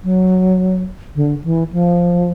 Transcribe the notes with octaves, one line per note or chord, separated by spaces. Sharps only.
F#3
D3
E3
F3